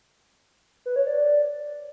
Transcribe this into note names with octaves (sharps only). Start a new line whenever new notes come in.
B4
C#5
D5
D5